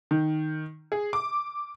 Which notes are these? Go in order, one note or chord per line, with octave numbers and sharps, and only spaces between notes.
D#3
G#4
D6